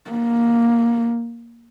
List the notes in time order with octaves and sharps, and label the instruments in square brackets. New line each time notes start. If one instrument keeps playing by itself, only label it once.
[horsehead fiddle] A#3